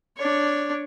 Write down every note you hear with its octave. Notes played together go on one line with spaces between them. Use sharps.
D4 C#5